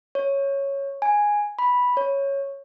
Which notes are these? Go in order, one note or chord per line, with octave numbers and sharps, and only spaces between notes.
C#5
G#5
B5
C#5